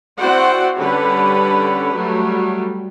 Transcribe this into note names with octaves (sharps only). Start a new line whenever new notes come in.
C4 E4 F#4 C5 D5 F#5
D3 G3 C#4 G4 B4 F#5
F#3 G3 A3